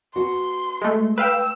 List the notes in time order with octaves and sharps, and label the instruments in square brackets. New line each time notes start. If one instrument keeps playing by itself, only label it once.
[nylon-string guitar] B3 F#4 [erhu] C6
[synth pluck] G#3 A3
[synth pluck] B4 F5 G5 [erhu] E6